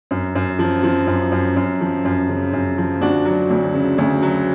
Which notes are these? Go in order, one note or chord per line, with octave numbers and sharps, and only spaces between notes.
F#2
F#2
F3
F3
F#2
F#2
F#2
F3
F#2
C#3
F#2
F3
D2 D4 F#4
F#3
D2
C#3
D2
F#3